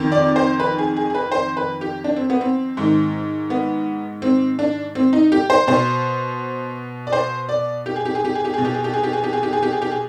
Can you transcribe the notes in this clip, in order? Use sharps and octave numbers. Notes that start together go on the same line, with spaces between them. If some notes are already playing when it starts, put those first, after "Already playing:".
Already playing: F2 D#3
D5
C5
B4
G#4
G#4
G#4
B4
C5
B4
G4
D4
C4
B3
C4
G#2 D#3
B3
C4
D4
C4
D#4
G4
C5
B2 C5
D5
C5
D5
G4
G#4
G4
G#4
G4
G#4
G4
B2 G#4
G4
G#4
G4
G#4
G4
G#4
G4
G#4
G4
G#4
G4
G#4
G4
G#4